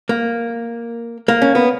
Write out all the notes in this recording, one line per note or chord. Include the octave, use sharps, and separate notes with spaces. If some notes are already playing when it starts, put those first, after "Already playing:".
A#3
A#3
C#4
B3